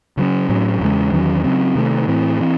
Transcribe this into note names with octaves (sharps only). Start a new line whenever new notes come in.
C#3 F#3 C#4
A2 F#3 C#4
E2 C#3 G#3 C#4
E2 D#3 F#3 C#4
C#3 F#3 C4
C3 D#3 A3
A2 E3 C4
E3 C4